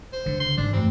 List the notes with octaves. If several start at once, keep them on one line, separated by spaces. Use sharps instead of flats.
C5
C#2 D3
C6
G#2 D#3 E3 D4
F#2 A3 C4